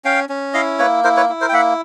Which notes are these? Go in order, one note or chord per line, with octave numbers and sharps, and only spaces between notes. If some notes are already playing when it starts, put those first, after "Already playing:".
C#4 F5 G5
C#4
E4 D#5 F5
A#3 B4 C#5
E4 A#4 C5
B4 C#5
E4
A#4 C5
G5
A#3 E5 F#5